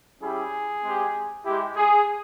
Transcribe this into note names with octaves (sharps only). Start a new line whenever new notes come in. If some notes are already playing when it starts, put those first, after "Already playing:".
G3 C#4 E4 G4 G#4
G#3 C4 G4
G#3 E4 G4
G#4